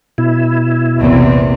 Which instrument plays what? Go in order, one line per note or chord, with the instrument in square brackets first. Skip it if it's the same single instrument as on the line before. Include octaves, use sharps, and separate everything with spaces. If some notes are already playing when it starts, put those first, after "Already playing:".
[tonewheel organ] B2 E4
[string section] A#1 E2 C3